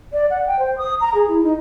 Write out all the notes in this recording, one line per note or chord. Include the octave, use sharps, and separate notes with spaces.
D5
F#5
G5
C5
D#6
A#5
G#4
E4
D#4